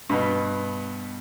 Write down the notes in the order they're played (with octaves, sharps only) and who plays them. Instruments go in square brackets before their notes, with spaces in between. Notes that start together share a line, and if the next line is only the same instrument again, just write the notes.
[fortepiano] G2 B2 B3